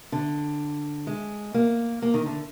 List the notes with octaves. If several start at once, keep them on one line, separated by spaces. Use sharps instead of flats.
D3
G#3
A#3
A#3
D#3
D3